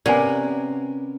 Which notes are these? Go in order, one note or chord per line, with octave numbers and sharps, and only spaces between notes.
C3 B3 C#4 A#4 D5 F#5 G#5